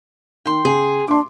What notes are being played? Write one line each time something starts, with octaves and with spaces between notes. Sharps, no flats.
D#3 G5 C6
C#3 G#4
D4 C6 D6